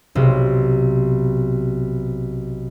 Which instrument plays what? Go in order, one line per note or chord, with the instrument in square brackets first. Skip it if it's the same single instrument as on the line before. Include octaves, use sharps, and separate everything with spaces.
[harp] B1 C3